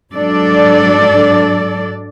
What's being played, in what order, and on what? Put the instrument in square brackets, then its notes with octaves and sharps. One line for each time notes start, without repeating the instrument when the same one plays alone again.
[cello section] G#2 F#3 D4 A4 D5